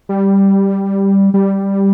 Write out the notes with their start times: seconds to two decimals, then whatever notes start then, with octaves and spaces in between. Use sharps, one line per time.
0.09 G3
1.34 G3